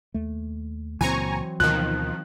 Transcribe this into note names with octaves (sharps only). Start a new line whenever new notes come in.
D#2 A3
C#2 A#2 E3 F#3 C4 G#5 A#5 C#6
D2 B2 D#3 F3 F#6